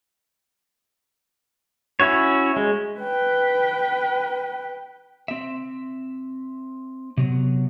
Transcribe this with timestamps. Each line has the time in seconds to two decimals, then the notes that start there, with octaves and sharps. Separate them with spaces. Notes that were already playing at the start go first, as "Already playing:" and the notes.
2.00 C#4 E4 F#4 C#5
2.56 G#3
3.00 B4 G5
5.28 C4 E5
7.17 C3 F#3 B3